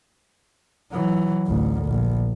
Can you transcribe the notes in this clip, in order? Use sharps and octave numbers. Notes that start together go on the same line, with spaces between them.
E3 F#3
A1 D2
A#1